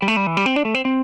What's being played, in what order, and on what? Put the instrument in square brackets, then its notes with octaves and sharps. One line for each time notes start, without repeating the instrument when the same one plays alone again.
[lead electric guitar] G3
A3
G3
E3
G3
C4
D4
A3
C4
C4